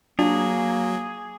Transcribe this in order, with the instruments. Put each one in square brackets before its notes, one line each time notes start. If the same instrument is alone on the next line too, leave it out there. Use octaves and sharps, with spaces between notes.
[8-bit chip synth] F#3 [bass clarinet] A#3 [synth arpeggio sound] D4 F4 A5 [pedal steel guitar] G#4